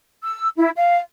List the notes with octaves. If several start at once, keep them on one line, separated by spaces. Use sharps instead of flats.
E6
E4
F5